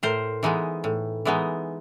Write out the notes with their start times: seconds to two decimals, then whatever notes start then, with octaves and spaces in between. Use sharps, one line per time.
0.03 A2 A#4 C5
0.43 E3 G#3 B3 D#4
0.84 A2
1.25 E3 G#3 B3 D#4